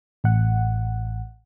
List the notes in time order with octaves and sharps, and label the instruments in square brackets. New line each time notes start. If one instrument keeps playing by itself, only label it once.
[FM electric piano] A1 F#5